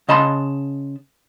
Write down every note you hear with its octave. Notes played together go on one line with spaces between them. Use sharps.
C#3 D#5 A5 B5 C6